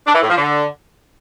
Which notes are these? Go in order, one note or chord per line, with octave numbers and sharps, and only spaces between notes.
D4
E3
A2
F3
D3